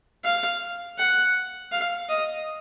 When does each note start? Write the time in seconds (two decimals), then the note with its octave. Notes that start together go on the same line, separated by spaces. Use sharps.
0.24 F5
0.98 F#5
1.72 F5
2.09 D#5